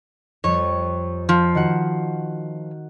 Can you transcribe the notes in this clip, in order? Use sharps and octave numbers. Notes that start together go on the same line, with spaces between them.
F2 G3 C#5
F3
D#3 F#4 F#5